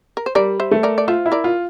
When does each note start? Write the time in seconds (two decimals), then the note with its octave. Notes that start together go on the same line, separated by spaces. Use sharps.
0.17 A#4
0.26 C5
0.35 G3 A#4 D5
0.60 C5 E5
0.71 A3
0.83 A#4 D5
0.98 D5
1.08 F4 C5 E5
1.26 E4
1.32 A#4 D5
1.44 F4